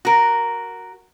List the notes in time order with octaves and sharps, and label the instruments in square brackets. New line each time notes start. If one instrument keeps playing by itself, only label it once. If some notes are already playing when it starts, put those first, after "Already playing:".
[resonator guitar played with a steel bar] F#4 A#4